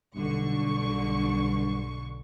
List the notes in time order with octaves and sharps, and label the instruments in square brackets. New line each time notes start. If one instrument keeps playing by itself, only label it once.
[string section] B1 D3 C#6 [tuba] G2